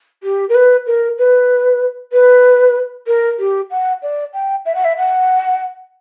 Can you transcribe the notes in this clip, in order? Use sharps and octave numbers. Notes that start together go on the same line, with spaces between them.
G4
A#4
B4
A#4
B4
B4
A#4
G4
F#5
D5
G5
E5
F#5
E5
F#5